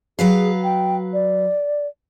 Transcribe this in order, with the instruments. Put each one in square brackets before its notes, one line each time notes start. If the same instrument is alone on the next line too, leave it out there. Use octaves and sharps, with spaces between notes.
[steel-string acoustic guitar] F#3 B4 F5 [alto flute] G#4
[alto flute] G5
D5